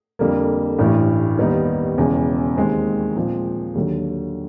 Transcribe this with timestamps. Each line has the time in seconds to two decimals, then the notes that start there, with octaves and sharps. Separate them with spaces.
0.19 F2 D3 G3 A#3
0.79 A1 G2 E3
1.38 D#2 D#3 G3 B3 D#4
1.97 E1 E2 C#3
2.56 D#2 D#3 G#3 C4
3.16 A#2 F3 G#3 C4
3.75 D#2 D3 F#3